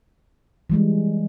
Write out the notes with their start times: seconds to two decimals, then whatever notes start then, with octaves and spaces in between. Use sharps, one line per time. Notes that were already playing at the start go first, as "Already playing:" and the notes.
0.70 E3 G3 G#3